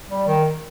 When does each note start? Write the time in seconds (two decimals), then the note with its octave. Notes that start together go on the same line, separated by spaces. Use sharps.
0.09 G3
0.27 D#3